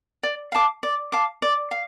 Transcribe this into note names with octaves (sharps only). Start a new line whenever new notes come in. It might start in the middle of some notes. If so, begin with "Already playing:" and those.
D5
F5 A5 D6
D5
F5 A5 D6
D5
F5